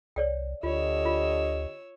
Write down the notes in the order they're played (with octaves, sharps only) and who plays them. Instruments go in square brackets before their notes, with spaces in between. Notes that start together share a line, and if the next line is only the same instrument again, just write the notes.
[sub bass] C2 [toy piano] C#5 D5 G5
[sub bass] D2 [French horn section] D3 G4 D#5 [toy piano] F4 [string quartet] C#5 E6
[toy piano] F4